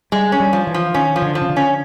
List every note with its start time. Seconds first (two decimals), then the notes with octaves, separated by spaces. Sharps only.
0.12 G3 G#3
0.32 C#4
0.40 G3
0.53 F3
0.67 E3
0.74 F3
0.94 D#3 C#4
1.16 F3
1.22 D3
1.35 F3
1.42 C#3
1.50 D3
1.56 C#4